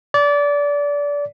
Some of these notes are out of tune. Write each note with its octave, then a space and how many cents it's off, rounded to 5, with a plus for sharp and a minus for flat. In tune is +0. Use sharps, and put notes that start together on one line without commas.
D5 -25